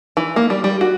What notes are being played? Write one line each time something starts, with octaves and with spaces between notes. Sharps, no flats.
E3
A#3
G3
G3
F#4